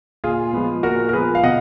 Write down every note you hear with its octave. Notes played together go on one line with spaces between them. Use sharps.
A#2 F4 G#4
F3 G#3 B3
A#2 F#4 A#4
A#4
F3 G#3 B3 G#4 B4
F5
B2 D#5 F#5